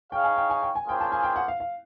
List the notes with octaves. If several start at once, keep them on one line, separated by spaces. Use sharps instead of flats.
D#4 G#4 C#5 F5 G5
G#5
G5
G#5
G5
G#5
A#3 C#4 F4 G#4 C5 G5
A5
G#5
G5
F#5
F5
F5